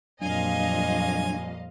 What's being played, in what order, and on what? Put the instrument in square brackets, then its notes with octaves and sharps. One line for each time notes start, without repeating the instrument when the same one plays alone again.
[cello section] F2 A#2 G3 [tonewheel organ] F#3 D4 [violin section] D#5 F5 [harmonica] G#5